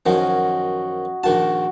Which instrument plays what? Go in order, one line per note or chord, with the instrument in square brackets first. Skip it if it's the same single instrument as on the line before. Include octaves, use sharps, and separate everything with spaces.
[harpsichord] F#2 D#3 F3 [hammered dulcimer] F#4 D#5 G#5
[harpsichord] A#1 D#3 A5 [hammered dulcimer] F#4